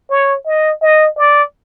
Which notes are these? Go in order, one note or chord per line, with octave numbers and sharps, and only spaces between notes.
C#5
D#5
D#5
D5